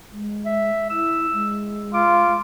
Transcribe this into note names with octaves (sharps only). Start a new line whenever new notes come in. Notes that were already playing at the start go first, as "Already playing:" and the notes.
G#3
E5
E4 E6
G#3
F4 D6